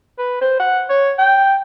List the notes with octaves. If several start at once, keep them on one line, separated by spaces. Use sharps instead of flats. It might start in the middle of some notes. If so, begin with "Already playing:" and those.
B4
C5
F#5
C#5
G5